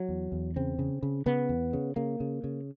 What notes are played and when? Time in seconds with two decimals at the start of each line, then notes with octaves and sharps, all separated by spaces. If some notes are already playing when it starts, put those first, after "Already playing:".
Already playing: F#3
0.09 E2
0.32 E2
0.56 C#3 C4
0.79 C#3
1.03 C#3
1.26 C#3 B3
1.49 E2
1.73 C#3
1.96 C#3 A#3
2.20 C#3
2.44 C#3